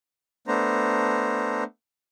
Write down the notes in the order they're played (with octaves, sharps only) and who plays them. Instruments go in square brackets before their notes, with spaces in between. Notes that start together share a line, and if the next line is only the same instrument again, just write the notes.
[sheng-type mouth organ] A3 B3 D4 C5 A#5